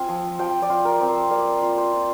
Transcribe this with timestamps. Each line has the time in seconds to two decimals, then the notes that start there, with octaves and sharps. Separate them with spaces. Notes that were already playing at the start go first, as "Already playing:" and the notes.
Already playing: C4 F4 G#5
0.08 F3
0.39 F3 G5
0.62 D5
0.70 F4
0.85 A#4
1.01 C4
1.08 C5
1.31 A#3 D5
1.63 F4
1.78 C5
1.93 F4